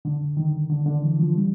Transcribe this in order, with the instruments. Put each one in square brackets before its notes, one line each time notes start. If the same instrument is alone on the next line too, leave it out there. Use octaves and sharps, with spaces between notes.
[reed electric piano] D3
D#3
D3
D3
E3
F3
G3